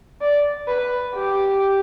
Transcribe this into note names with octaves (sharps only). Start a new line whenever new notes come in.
D5
B4
G4